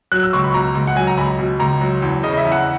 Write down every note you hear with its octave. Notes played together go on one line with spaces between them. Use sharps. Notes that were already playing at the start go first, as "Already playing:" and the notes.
F#3 F#6
E6
C#2 C#6
B5
B2 A#5
C#2
F#5
F#3 G#5
A#5
C#2 B5
B2
C#2 A#5
F#3
E2
C#3 D#5
D#5
E5
E2
F#5